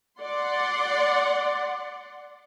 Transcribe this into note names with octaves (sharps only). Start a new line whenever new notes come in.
D5 F#5 C6